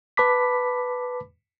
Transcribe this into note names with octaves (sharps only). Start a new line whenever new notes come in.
B4 A5 B5 D6 B6